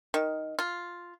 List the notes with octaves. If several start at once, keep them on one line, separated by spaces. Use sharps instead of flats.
D#3
F4